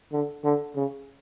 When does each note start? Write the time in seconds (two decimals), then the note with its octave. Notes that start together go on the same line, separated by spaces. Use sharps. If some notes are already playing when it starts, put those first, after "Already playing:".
0.12 D3
0.44 D3
0.76 C#3